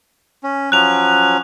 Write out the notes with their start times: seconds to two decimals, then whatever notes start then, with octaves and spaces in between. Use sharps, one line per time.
0.44 C#4
0.72 F3 F#3 C#4 F#6 F7